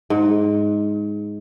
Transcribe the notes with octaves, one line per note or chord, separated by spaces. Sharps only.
G#2